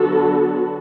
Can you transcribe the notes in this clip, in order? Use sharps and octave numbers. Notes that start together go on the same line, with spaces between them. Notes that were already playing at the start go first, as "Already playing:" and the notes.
Already playing: D3 F#3 B3 F#4 A4